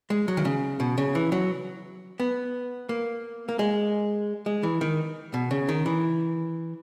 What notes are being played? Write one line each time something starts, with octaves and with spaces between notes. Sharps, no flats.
G#3
F#3
D#3
C#3
B2
C#3
E3
F#3
B3
A#3
A#3
G#3
G#3
E3
D#3
B2
C#3
D#3
E3